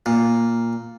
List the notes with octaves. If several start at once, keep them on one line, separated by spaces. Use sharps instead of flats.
A#2